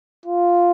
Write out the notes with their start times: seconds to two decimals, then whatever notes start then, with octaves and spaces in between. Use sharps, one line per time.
0.26 F4